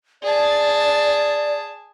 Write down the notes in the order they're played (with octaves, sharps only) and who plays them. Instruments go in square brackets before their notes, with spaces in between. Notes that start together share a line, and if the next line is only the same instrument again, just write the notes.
[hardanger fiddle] G#4 A5 [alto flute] D5